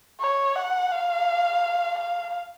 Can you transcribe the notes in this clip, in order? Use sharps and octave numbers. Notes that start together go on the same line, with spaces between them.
C#5
F#5
F5
F5